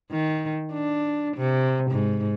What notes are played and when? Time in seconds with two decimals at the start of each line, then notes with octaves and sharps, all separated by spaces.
0.11 D#3
0.73 D4
1.37 C3
1.91 G#2